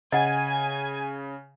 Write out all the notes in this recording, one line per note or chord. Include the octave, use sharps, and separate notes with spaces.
C#3 D#5 F#5 G#5